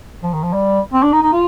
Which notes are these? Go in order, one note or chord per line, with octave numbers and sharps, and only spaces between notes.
F3
D#3
F3
G3
C4
D4
D#4
D#4
F4